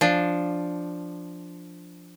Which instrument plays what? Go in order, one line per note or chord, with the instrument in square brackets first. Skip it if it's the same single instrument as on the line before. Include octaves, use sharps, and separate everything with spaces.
[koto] F3 D4